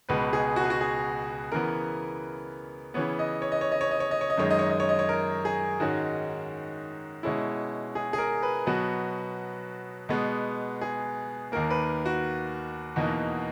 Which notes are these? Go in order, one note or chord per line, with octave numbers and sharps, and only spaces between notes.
C#2 B2 G#3 B4
G#4
F#4
G#4
F#4
G#4
C#3 E3 B3 A#4
C#3 E3 B3 C#5
D#5
C#5
D#5
C#5
D#5
C#5
D#5
C#5
D#5
C#5
D#5
F#2 D#3 G#3 C#5
D#5
C#5
D#5
C#5
D#5
C#5
A#4
G#4
G#2 D#3 G#3 C#4 F#4
B2 G#3 C#4 E4
G#4
G#4
A#4
B4
B2 F#3 B3 F#4
B2 G#3 B3
G#4
D#2 D#3 A#3 A#4
B4
F#4
E2 B2 A#3 D#4